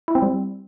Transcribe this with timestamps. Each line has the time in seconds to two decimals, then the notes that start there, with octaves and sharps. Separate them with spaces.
0.08 E4
0.15 C4
0.22 G3